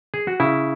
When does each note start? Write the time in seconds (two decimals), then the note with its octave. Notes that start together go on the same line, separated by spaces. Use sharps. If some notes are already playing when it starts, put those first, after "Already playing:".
0.14 G#4
0.27 F#4
0.40 C#3 E4